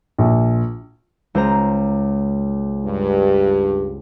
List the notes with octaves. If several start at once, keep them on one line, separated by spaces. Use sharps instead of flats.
A#1
C#2 C5 A#5
G2